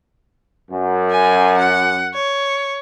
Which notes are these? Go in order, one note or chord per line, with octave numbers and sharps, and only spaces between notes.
F#2
G#5
F#5
C#5